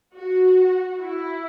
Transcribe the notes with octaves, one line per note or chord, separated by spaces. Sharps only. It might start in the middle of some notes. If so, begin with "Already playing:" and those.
F#4
E4